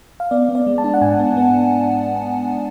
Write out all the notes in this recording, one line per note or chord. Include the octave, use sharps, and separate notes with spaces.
F5
B3 D5
B3
D5
G#3
A5
D4
F#5
G#2 G#5
B3
B3